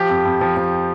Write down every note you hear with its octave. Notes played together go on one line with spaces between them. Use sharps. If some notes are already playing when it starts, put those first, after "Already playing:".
Already playing: F3 G4
F2
F2
F3
F3